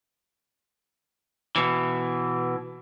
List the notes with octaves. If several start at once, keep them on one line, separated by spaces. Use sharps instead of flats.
B2 E3